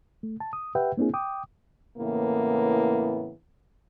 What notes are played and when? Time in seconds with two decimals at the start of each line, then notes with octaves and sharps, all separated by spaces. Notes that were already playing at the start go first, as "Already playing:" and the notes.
0.23 A3
0.40 A5
0.53 D#6
0.75 G4 B4 E5 F#5 G5
0.97 A#3 C4 D4 E4 G#4
1.14 G5 D6 D#6
1.98 A2 C#3 E3 A#3 B3